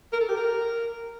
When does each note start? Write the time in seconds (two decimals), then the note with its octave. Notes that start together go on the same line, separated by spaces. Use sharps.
0.13 A#4
0.21 A4
0.29 G4
0.37 A#4